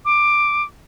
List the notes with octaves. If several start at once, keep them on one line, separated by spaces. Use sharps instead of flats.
D6